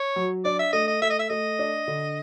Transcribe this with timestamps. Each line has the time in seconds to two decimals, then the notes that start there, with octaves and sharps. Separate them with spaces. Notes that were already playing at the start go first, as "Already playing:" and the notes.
Already playing: C#5
0.16 F#3
0.45 D4 D5
0.59 E5
0.73 A3 D#5
0.88 D#5
1.02 A3 E5
1.10 D#5
1.19 E5
1.30 A3 D#5
1.59 D4
1.88 D3